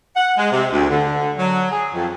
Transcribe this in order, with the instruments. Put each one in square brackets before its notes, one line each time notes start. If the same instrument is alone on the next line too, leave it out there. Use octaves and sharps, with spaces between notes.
[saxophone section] F#5
G#3
C3
D2
D3
F#3
G#4
F2